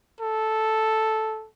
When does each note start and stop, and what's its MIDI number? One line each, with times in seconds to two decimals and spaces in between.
0.21 1.48 69